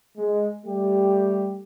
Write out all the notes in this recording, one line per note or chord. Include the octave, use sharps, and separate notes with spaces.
G#3
G3 A3 G4